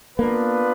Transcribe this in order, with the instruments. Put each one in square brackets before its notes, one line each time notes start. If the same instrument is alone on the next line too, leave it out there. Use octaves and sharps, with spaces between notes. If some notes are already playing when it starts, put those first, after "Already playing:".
[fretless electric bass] A#3 [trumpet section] B3 D4 F4 B4